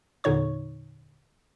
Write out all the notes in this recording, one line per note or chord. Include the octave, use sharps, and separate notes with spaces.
E2 A#2 D3 D#4 C#5 C#6